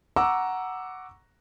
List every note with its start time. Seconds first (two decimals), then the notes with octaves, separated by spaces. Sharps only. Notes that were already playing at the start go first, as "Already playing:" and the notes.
0.16 F#5 A#5 C#6 D6 E6